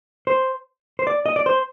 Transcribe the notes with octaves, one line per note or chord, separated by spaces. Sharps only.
C5
C5
D5
D#5
D5
C5